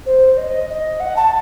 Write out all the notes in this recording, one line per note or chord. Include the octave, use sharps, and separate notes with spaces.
C5
D#5
D#5
F#5
A5